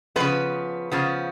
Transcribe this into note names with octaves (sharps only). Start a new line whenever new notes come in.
C#3 F3 B3 B4
C#3 F3 B3